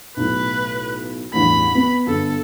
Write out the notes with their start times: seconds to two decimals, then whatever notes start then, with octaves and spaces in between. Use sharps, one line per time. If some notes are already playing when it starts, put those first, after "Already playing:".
0.17 B1 A2 B4
1.33 A1 E2 G2 B5
1.75 B3
2.07 G1 A4